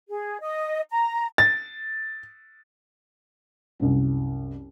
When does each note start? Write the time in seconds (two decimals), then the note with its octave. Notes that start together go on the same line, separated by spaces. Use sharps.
0.09 G#4
0.41 D#5
0.91 A#5
1.38 A6
3.79 C2 F#2